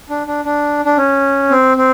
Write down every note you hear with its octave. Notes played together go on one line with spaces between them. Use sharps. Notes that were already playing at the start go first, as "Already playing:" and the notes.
D4
D4
D4
D4
C#4
C4
C4